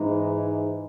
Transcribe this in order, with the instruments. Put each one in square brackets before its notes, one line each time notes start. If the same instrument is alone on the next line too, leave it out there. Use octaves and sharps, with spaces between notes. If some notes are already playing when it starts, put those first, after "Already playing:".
Already playing: [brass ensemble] G#2 E3 G#3 D#4